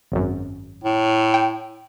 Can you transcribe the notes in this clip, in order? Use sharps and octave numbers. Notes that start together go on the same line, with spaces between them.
G#1 F#2
A2
G5